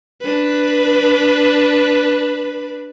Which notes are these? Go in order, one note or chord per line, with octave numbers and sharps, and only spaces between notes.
D4 B4